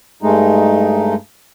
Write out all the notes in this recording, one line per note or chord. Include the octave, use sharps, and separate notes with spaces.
G2 G#3 A3 D#4